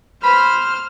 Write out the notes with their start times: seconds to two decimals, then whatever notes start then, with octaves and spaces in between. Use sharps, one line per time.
0.23 C5 B5 F6